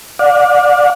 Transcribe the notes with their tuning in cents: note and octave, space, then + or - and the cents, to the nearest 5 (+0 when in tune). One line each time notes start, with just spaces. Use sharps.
D5 +0 F#5 -45